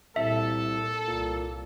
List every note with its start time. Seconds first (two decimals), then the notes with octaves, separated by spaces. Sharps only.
0.16 C2 A#2 A4 E5
1.07 C2 A#2